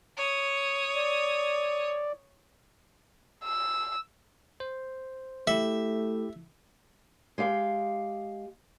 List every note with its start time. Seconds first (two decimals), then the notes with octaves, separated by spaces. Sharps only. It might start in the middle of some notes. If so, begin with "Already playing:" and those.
0.17 C#5 D#6
0.95 D5
3.45 E6
4.60 C5
5.47 A3 E4 G4 E5
7.38 G#3 G4 F5